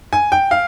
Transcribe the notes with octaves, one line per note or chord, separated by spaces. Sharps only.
G#5
G5
F5